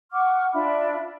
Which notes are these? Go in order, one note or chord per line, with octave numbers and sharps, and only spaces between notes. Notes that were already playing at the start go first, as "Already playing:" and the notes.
F#5 C#6 D6 F6
D4 F4 E5 B5